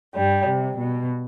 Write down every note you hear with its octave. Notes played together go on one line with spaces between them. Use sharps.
G2 G3
C3
B2